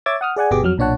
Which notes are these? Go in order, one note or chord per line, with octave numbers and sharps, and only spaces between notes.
C#5 E5 D6 E6 G#6 A6
F#5 D#6 F6
G#4 D5 F#5 G#5
G1 B2 B3 G4 G#4 D6
F2 F#3 F6
B1 A#2 D4 C#5 F#5 A5